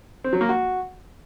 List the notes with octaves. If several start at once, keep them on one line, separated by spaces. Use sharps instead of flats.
C4
F#3
A#3
F#4